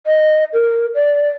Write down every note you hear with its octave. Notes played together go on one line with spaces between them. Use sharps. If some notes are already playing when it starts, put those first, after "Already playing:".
D#5
A#4
D5